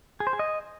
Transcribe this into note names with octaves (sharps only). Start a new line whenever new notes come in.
G#4
C5
G#4
D#5